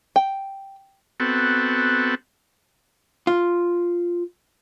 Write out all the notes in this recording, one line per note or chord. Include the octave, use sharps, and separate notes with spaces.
G5
B3 C4 F#4 A4
F4